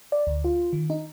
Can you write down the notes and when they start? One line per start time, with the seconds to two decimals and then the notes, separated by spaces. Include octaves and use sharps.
0.12 D5
0.27 D2
0.44 F4
0.73 D#3
0.90 D#4